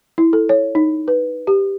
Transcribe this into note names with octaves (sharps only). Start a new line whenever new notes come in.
E4
A4
C#5
D#4
B4
G4